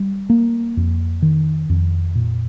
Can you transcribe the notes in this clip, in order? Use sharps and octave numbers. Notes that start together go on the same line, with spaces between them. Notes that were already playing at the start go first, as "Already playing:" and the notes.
Already playing: G3
A#3
F2
D#3
F2
A#2